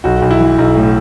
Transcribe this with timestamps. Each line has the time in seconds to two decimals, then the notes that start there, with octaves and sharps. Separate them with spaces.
0.04 B1 F#4
0.22 B1
0.31 E4
0.40 E3
0.58 B1
0.76 A2